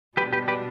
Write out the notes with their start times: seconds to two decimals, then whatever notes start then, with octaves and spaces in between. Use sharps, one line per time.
0.17 B2 G3 D4 G4 B4
0.33 G4 B4
0.48 G4 B4